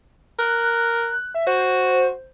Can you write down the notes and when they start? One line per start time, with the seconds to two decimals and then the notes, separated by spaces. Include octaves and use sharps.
0.39 A#4 F#6
1.35 E5
1.47 F#4 C5